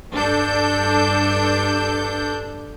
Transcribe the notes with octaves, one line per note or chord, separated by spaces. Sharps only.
G2 D4 A4 G6